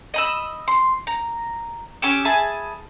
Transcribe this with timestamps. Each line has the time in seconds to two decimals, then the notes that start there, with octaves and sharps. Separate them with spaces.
0.14 D#5 B5 E6
0.68 C6
1.07 A#5
2.02 C#4 G4 E6
2.25 G#4 E5 A5 B5